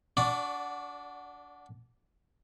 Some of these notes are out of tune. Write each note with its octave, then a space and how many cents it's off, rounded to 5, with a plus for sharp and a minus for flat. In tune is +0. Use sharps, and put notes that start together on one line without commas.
D4 -25 F#4 +0 D5 +0